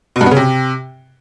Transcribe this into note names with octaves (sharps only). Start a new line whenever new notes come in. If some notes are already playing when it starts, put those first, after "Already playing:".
B2
G2
B3
C#3
C3